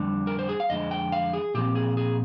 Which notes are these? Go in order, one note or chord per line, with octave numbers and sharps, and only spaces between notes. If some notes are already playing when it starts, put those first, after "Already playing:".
Already playing: F2 D3 G3
A#4
C5
G#4
F5
F2 D3 F3 G#3 D#5
G5
F5
G#4
A#2 F3 C4 G4
G#4
G#4